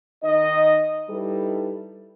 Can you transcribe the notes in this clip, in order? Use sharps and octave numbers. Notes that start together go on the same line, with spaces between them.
D#3 D#4 D#5
G3 D#4 E4 A4 B4